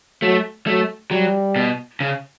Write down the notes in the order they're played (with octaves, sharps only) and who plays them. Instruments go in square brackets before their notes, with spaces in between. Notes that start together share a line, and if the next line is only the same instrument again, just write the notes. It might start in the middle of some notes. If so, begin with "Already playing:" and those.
[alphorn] F#3 [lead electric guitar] A3
[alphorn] F#3 [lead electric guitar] A3
[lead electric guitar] F#3 [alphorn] G3
[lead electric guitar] B2
C#3